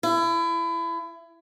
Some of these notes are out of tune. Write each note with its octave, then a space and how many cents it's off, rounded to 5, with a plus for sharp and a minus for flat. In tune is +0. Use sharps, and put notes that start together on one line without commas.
E4 +30